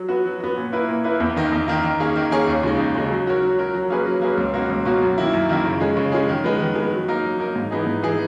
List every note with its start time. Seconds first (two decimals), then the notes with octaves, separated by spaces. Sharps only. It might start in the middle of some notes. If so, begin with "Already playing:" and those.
Already playing: F#3
0.09 B3 F#4
0.26 F#3
0.40 B3 F#4
0.57 A#2
0.72 A#3 E4 B4
0.89 A#2
1.04 A#3 E4 B4
1.20 E2
1.36 D#3 A#3 D#4
1.52 E2
1.68 D#3 A#3 D#4
1.83 D#3
2.00 A#3 C#4 G#4 C#5
2.16 D#3
2.31 A#3 C#4 G#4 C#5
2.47 D#2
2.63 C#3 G#3 D#4
2.78 D#2
2.95 C#3 G#3 D#4
3.10 F#3
3.26 C#4 F#4 A#4 C#5
3.42 F#3
3.58 C#4 F#4 A#4 C#5
3.74 F#3
3.90 A#3 C#4 G#4 B4
4.06 F#3
4.22 A#3 C#4 G#4 B4
4.38 C#2
4.54 B2 A#3 C#4 F#4
4.70 C#2
4.85 B2 A#3 C#4 F#4
5.02 F#2
5.18 D#3 A#3 E4
5.33 F#2
5.49 D#3 A#3 E4
5.65 C#3
5.80 G#3 C#4 G#4
5.97 C#3
6.12 G#3 C#4 G#4
6.29 D#3
6.44 G#3 B3
6.60 D#3
6.75 G#3
6.80 B3
6.92 F#3
7.08 A#3 D#4 A#4
7.23 F#3
7.39 A#3 D#4 A#4
7.56 G#2
7.71 E3 B3 D#4 G#4
7.87 G#2
8.03 E3 B3 D#4 G#4